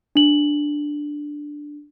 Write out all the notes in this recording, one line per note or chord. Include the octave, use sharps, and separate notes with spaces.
D4 F#7